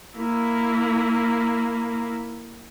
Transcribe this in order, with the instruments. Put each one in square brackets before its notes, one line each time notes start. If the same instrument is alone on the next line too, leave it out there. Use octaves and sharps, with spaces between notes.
[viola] A#3 E4